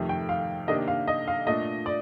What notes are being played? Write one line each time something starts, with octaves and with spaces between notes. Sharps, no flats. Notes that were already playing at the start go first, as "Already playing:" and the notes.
Already playing: F2 C3 D#3 A3
G5
F5
C3 D#3 A#3 D4 D#5
F5
D#5
F5
A#2 A3 D4 D#5
D5